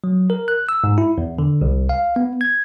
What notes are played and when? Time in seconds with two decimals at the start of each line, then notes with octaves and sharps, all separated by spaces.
0.04 F#3
0.30 A#4
0.48 F#6
0.69 E6
0.84 G#2
0.98 E4
1.18 E2
1.39 D3
1.61 C2
1.89 F5
2.16 B3
2.41 G#6